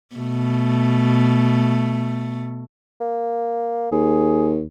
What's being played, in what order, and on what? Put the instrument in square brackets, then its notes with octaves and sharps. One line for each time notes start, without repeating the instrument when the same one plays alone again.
[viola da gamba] B2 A3
[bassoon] A#3
[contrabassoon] D#2 [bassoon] G#4